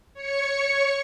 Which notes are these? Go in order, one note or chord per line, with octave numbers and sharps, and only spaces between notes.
C#5 C#6